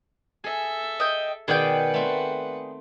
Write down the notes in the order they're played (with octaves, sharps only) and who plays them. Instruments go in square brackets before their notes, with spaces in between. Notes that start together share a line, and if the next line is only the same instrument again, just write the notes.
[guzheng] G#4 [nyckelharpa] A4 E5
[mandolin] D#5 G5
[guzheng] B2 D#3 [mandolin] G#4 D5 G5 [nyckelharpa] B4 F#5
[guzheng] A3 C4